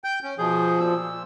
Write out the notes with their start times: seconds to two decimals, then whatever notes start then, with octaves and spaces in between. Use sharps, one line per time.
0.04 G5 G6
0.23 C#4
0.38 B2 F3 G#4 G6
0.80 A#2 E6